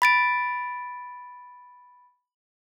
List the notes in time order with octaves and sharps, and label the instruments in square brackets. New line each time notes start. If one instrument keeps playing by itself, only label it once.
[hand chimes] B5 A6 D7